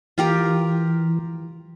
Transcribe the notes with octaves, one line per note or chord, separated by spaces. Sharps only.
E3 F4 G4 A#4